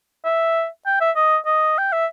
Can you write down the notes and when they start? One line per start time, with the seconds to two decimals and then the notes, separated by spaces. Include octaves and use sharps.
0.25 E5
0.86 G5
1.01 E5
1.16 D#5
1.46 D#5
1.78 G5
1.92 E5